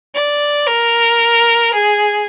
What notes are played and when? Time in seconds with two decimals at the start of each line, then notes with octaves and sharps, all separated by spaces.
0.15 D5
0.67 A#4
1.74 G#4